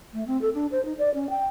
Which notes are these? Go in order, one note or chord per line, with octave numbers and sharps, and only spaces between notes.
A3
C4
A4
D4
C5
D#4
D5
C#4
G5